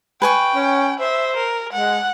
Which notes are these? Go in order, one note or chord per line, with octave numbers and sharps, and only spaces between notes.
B4 G5 G#5 C#6
C#4
C5 E5
A#4
G#3 F#5